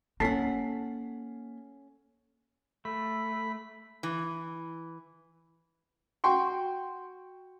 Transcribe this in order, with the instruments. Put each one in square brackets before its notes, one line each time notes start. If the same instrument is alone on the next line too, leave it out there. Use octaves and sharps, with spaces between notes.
[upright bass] A#3 [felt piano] C#4 B6 C7 [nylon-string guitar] A4 C#5 F#5 [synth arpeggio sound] A5
[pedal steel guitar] A3 [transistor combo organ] B5
[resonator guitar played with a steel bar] E3
[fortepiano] F#4 G5 C6 C#6